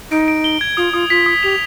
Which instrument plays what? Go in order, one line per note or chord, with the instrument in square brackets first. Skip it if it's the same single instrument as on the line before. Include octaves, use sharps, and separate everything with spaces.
[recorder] D#4 [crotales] D7
[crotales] D7
G7
G#6
[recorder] F4 [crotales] D#6
[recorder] F4 [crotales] D#6
[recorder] F4 [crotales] B6
[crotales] D#6
[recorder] G4 [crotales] F7